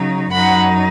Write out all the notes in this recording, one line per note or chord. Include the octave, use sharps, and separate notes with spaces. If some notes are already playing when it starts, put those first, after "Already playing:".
Already playing: C#3 F#3 D#4
F#2 F#3 D#4 F#5 B5